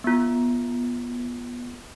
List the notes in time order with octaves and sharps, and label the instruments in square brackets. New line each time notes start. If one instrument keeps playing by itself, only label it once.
[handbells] B3 F4